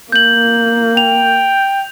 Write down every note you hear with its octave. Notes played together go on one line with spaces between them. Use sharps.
A#3 G6 F#7
G5 F7